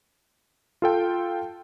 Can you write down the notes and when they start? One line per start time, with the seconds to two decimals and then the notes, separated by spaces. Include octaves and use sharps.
0.82 F4 A4 G5